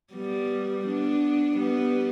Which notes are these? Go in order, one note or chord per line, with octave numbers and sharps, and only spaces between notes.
G3 B3
B3 D4
G3 B3